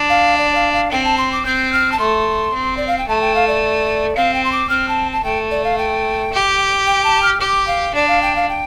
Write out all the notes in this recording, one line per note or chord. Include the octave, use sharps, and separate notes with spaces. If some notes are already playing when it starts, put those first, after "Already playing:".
Already playing: D4
F5
D5
F5
F5
C4 G5
A5
C6
D6
C4 G6
F6
A5
A3 C6
C4
D5
F5
G5
A3 A5
G5
F5
D5
C4 F5
G5
C6
D6
C4 F6
A5
A5
A3 G5
D5
F5
G5
G4
G5
A5
F6
G4 D6
F5
D4 D5
F5
G5
F5
G5